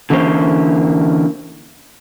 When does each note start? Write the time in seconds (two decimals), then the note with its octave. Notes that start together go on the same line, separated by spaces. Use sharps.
0.10 D3 E3 A#3 C#4 C5